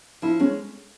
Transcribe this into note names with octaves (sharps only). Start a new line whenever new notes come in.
F3 E4
G#3 C#4